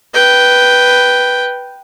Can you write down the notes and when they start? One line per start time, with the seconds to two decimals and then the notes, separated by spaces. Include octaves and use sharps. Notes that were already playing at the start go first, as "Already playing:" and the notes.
0.14 B4 G5